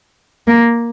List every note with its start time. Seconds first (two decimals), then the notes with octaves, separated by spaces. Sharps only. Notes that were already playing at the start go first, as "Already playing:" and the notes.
0.47 A#3